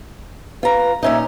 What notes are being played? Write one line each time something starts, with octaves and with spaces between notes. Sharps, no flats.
F4 B4 A#5
A#2 C#4 D#4 E5